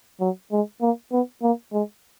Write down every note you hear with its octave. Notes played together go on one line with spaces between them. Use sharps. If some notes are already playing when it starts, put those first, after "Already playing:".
F#3
G#3
A#3
B3
A#3
G#3